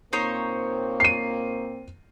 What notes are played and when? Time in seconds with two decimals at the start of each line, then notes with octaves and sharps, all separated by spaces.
0.13 A#2 A#3 C4 D#4 C5 C#5
1.00 C7 D#7